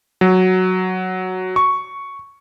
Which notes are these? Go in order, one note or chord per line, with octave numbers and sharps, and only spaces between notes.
F#3
C#6